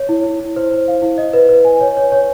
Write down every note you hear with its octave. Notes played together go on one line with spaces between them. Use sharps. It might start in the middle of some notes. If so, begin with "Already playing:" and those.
Already playing: C#5
E4
E4
E4
C5
C5
F5
E4
D#5
B4
B4
G#5
C#5
C#5
C#5